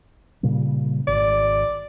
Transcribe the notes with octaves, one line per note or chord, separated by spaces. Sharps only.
A#2 C#3 G3
G#1 D5